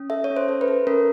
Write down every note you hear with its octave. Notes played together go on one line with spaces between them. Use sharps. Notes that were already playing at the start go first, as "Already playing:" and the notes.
Already playing: C#4
A4 E5
C#5
C#4
C5
A4
B4
A4
C#4 A#4